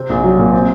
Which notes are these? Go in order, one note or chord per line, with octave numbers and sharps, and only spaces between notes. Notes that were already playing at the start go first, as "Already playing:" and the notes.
Already playing: C3 C4
A#1
F#3
A#2
C4